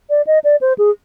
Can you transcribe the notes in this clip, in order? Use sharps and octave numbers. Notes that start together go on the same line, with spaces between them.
D5
D#5
D5
C5
G#4